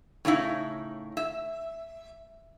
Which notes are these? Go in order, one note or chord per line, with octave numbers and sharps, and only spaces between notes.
A2 C#3 D#4 E4
E5